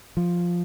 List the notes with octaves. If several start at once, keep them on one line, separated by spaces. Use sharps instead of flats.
F3